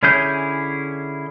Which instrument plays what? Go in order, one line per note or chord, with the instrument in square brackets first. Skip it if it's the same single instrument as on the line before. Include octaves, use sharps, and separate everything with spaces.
[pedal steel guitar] D3 C#4 E4 G#4 G6